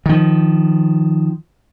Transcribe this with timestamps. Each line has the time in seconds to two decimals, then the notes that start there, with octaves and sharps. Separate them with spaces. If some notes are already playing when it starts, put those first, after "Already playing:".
0.06 D#3 F3